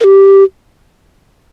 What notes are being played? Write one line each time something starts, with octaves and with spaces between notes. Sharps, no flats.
A#4
G4